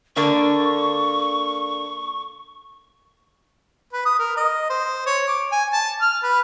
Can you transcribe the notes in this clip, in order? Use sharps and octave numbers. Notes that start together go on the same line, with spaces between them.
D3 A#3 D4 C#6
B4
D#6
A#4
D#5
C5
C#5
D6
G#5
A5
F6
B4